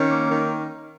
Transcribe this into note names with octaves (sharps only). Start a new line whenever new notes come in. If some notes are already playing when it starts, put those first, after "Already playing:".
Already playing: D#3 C#4
A#3
D#3